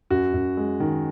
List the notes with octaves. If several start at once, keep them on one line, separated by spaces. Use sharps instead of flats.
F#2 F#4
F#2
G#3
D#3